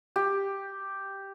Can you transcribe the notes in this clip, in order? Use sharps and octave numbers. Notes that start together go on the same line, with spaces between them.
G4